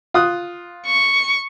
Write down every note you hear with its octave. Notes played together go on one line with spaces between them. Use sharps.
F4 D#6 F#6
C#6